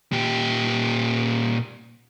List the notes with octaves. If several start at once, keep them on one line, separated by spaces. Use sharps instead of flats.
A#2 G4